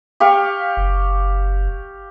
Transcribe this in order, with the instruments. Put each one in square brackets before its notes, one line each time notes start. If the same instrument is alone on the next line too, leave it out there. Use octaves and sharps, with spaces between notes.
[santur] G4 F5 C#6
[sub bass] F#1